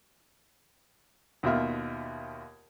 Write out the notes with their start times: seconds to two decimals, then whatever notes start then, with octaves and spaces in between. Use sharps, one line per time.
1.43 D#2 B2 F4 E5 F6